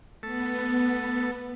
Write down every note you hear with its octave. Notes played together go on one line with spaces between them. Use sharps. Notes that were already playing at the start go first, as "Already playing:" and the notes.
A3 B3 A4